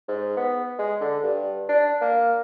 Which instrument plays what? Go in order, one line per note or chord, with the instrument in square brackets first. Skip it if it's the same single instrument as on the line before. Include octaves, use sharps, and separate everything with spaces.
[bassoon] G#2
B3
G#3
D3
G2
D4
A#3